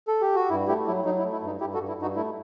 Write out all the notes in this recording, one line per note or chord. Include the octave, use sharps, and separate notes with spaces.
A4
G4
F#4
G2 E4
A3 E4 G4
F#3 E4
F#3 D#4
E4
A3
E4
G2 D#4
G2 E4 G4
F#4 A4
G2
E4
G2 D#4 F#4
A3 E4